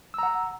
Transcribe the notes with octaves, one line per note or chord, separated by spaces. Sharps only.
F#5 A#5 E6